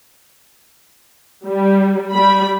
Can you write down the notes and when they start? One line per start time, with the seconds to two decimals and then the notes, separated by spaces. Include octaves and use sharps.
1.47 G3
2.12 G3 B5